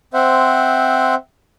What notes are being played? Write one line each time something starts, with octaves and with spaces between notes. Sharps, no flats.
C4 C5 E5 F#5